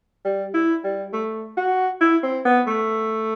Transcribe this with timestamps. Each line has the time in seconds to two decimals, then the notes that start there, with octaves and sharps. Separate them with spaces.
0.25 G3
0.54 E4
0.84 G3
1.13 A3
1.57 F#4
2.01 E4
2.23 C4
2.45 B3
2.67 A3